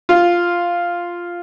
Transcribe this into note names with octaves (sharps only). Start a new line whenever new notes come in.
F4